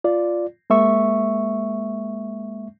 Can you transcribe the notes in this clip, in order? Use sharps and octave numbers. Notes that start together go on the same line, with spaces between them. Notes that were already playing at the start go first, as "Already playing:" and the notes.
F4 D5
G#3 A#3 E5 C#6